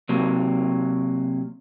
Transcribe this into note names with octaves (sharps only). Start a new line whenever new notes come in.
C3 F#3 A#3